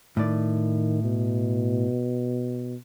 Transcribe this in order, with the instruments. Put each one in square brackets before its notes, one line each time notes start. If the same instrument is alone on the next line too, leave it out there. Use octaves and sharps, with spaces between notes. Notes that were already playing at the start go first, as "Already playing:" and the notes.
[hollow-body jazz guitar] A2 D5 [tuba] D#3
[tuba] B2